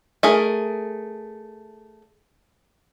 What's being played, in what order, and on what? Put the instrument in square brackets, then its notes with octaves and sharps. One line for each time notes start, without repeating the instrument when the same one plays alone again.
[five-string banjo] A3 G#4 A#4